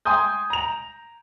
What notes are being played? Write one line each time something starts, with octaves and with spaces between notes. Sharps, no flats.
G5 G#5 C6 D#6 G6
A#5 F7